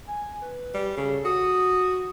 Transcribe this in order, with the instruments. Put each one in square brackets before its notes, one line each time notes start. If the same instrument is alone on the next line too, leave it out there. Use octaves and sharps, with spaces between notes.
[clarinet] G#5
B4
[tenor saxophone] G3
[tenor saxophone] C#3 [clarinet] A4
[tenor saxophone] F#4 [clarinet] D#6